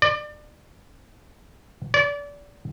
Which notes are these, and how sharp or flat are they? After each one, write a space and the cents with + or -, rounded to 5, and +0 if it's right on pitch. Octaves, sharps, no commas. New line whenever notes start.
D5 +30
D5 -30